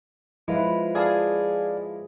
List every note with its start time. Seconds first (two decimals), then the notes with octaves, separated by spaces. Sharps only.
0.48 F3 G#3 E4 F4 B4
0.95 G#4 D5 F5 A5